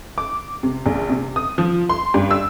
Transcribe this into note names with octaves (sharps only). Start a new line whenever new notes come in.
D6
C3
A#1
C3
D#6
F3
C6
G2
E6